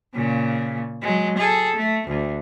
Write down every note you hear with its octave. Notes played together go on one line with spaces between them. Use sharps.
A#2 C#3
F#3 G#3
G#4 A4
A3
D2